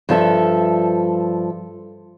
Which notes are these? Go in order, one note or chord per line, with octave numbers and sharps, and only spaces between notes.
G2 F3 A4 E5